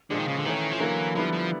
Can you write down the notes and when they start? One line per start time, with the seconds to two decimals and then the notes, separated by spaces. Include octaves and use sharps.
0.10 A#2 D3 F3 G#3
0.19 D#3
0.28 C#3
0.37 D3
0.46 D#3 E3 A3 C#4
0.72 F3
0.80 D3 E3 F#3 A#3
1.15 D3 F3 G3 B3 E4
1.33 F3